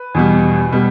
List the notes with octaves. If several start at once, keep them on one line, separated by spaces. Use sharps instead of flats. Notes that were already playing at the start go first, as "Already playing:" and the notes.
Already playing: B4
E2 B2 G3
B2 G3